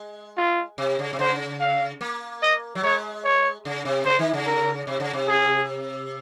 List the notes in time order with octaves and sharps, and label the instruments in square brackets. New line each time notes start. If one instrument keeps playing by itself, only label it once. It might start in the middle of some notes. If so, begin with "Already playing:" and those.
Already playing: [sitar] G#3
[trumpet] F4
[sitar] C3
C#3
C3
[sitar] C#3 [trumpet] C5
[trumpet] F5
[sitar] A#3
[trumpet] D#5
[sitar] F#3
[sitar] G#3 [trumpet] C#5
[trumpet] C#5
[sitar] C#3
C3
[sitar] C#3 [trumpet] C5
[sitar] D#3
C#3
[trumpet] A#4
[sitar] C3
C#3
C3
[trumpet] G#4